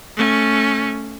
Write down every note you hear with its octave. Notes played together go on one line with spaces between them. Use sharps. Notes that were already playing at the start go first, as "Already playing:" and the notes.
A3 C#4